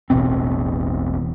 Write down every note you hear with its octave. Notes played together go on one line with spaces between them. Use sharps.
E1 A1 B2 C4